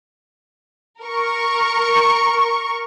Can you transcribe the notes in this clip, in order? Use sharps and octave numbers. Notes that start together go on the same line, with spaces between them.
A#4 C#6